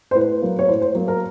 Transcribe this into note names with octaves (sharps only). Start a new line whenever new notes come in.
C5
A2 B4
F#3 A#3
C#5
A2 C5
C5
F#3 A#3
A#4